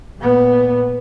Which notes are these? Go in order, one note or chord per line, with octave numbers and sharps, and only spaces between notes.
A#2 B3